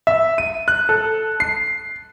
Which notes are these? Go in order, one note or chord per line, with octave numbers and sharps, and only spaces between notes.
E5
D#7
F#6
A4
C7